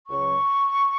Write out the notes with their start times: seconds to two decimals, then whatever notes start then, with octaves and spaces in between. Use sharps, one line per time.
0.08 C#2 C#3 F#3 C#6